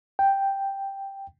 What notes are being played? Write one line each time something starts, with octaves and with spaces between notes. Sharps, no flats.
G5